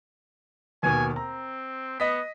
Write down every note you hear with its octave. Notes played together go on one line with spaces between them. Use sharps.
D#2 B2 G#5
C4 A#5
B3 D#5 B6